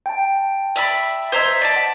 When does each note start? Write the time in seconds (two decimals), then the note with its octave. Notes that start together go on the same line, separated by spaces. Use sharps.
0.06 G5 A5
0.76 D5 E5 B5
1.32 C5 D#5 E5 A#5 G#6
1.61 D5 A5
1.76 F#5 B6